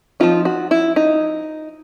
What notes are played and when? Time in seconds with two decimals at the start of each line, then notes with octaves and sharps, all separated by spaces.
0.20 F3 A3 C4 D#4 F4
0.45 F#4
0.71 E4
0.96 D#4